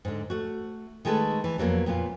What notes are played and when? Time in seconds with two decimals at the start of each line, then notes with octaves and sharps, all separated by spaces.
0.05 G#2 D3
0.30 A3 F#4
1.05 D#3 G#3 A3 A4 B4
1.44 E3
1.58 F2 F#3 G#3 A#3 B3
1.86 F2 A#2 B3 F4